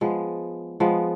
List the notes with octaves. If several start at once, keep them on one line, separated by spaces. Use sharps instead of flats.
F3 G#3 B3
F3 G#3 B3